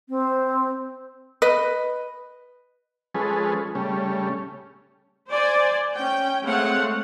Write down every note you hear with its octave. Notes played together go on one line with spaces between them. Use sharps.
C4
B4 D#5
F3 G#3 C#4 G#4 A4 B4
C#3 G3 A3 C#4
C5 D5 G#5
C#4 G5
G#3 A3 C4 C#5 F5 F#5